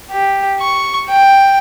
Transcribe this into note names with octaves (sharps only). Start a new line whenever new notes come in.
G4
C#6
G5